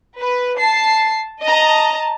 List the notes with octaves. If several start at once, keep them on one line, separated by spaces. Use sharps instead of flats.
B4
A5 C7
D#5 A5 A#5